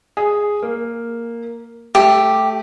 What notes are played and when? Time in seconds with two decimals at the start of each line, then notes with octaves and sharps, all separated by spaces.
0.17 G#4
0.63 A#3
1.95 A3 G4